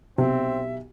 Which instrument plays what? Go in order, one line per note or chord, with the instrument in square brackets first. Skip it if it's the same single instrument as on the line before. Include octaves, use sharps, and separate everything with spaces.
[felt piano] B1 G4 [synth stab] C3 [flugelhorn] C4 [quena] E5